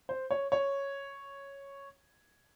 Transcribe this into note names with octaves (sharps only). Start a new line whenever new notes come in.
C5
C#5
C#5